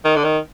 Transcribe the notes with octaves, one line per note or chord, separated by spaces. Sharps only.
D#3
D3
D#3